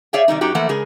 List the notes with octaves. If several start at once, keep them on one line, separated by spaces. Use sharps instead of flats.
G#4 C#5 D5 E5 F5 G5
C3 D#3 G3 D#4
F#2 D#4 F#4 G4
E3 F3 A3 A#3 F#5
C#3 G#3 G#4 A#4